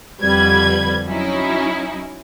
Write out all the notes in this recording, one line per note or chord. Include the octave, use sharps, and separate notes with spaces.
F2 D3 G3 B4 G#6
F#3 C#4 D#4 E4